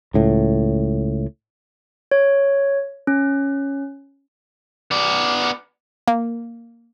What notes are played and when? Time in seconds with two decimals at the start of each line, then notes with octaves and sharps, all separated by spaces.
0.14 C#2 A2
2.11 C#5
3.07 C#4
4.91 B3 D5
6.08 A#3